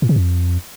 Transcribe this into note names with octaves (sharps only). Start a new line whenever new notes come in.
A2
C3
F2